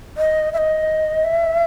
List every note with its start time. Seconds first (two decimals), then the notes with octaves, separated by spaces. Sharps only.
0.17 D#5
0.53 E5
0.58 D#5
1.24 E5